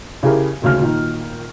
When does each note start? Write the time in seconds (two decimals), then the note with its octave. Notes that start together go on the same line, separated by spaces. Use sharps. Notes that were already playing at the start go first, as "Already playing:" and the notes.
0.23 C#3 E4 G4 G#4 A#4
0.62 D#1 D2 C#3 F6
0.82 A#2 D#3